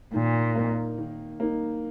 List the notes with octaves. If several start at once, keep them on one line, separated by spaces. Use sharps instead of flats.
A#2 D#3
A#3 D#4
D#3
A#3 D#4